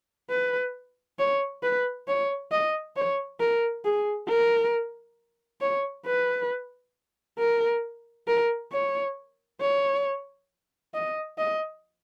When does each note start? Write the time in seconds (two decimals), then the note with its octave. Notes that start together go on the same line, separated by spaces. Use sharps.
0.30 B4
1.19 C#5
1.63 B4
2.08 C#5
2.52 D#5
2.96 C#5
3.40 A#4
3.85 G#4
4.29 A#4
5.61 C#5
6.06 B4
7.39 A#4
8.28 A#4
8.72 C#5
9.61 C#5
10.94 D#5
11.38 D#5